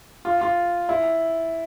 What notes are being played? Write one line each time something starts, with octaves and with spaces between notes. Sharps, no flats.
F4
F4
E4